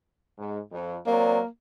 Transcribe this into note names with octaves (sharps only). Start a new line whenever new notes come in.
G#2
F2
F#3 A#3 C4 D5